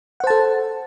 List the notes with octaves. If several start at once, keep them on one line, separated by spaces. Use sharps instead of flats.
A4 C5 F#5 A5